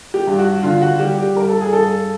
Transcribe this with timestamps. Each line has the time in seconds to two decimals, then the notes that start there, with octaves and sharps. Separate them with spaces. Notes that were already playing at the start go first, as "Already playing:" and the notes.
0.14 G4
0.27 G2
0.38 F#4
0.63 D3 F4
0.82 F#4
1.00 G3 G4
1.18 G4
1.36 G2 A#4
1.48 A4
1.61 G#4
1.73 G2 A4